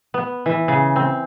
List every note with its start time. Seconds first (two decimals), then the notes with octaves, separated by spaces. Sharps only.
0.14 B3
0.46 E3
0.68 C#3
0.96 C4